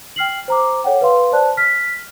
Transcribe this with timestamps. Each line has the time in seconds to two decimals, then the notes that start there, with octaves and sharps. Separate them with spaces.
0.16 G5 F6 C7 F#7
0.48 C5 A#5 D6
0.84 A4 C#5 F#5 G5
1.01 B4 F5 C6
1.32 C5 D5 A5 F#6
1.57 F6 B6